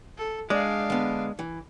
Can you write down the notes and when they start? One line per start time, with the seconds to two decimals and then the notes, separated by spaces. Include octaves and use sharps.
0.18 A4
0.50 G#3 D4 D5 F5
0.90 D3 B3
1.39 E3